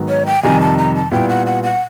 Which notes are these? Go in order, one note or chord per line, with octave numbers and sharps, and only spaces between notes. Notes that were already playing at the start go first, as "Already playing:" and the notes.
Already playing: G#2 D#3 F#3 B3
C#5
G5
F2 C3 D#3 G3 G#5
A5
A#5
A5
A#2 G3 B3 E4 G5
F#5
F#5
F#5